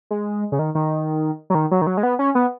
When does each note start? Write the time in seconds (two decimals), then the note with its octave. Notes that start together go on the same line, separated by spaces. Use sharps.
0.11 G#3
0.52 C#3
0.59 D#3
0.75 D#3
1.50 F#3
1.55 D#3
1.71 F#3
1.82 D#3
1.87 F#3
1.97 G#3
2.03 B3
2.19 C#4
2.35 B3